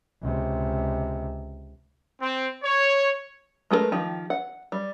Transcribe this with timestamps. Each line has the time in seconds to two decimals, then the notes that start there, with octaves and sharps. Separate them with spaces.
0.22 C#2 C3
2.21 C4
2.63 C#5
3.71 G#3 A3 G#4 A#4 B4
3.92 D#3 F3 G4
4.30 F#5
4.72 G3